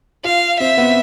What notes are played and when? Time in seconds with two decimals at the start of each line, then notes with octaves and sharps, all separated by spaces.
0.24 F4 F5
0.60 C4 E5
0.77 B3